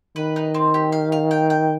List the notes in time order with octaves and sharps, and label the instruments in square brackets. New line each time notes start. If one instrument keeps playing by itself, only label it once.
[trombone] D#3 [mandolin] B4
[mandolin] D#4
C4
G4
F5
F5
G5
G5